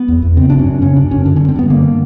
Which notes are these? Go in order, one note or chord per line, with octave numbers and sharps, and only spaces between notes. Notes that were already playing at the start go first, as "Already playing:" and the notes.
Already playing: B3
E2
E2
C#3 C4
F#2 D4
C#4
F#2
C#3 C#4
F#2 D4
F#2 C#4
D3 D4
C#4
G2
C4
G2 B3
D3 A#3